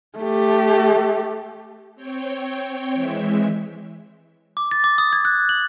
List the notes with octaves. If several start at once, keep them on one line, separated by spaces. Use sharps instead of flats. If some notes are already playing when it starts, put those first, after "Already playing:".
A3 G4
C4 C#5 G5
E3 G#3 E5
D6
A6
D6
D#6
G#6
F#6
F#7